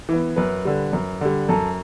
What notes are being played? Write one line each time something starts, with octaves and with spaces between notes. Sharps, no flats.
E3 B3
F#2 B4
D3 G3
F#2
D3 G3
F#2 A4